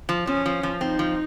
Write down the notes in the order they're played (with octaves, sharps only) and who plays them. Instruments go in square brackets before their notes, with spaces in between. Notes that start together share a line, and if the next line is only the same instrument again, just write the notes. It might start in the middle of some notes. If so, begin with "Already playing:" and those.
[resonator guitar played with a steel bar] F3
[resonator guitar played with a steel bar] F3 [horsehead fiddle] C#4
[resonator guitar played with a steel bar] F3
F3
[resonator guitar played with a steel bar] C4 [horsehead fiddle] D#4
[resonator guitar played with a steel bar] F3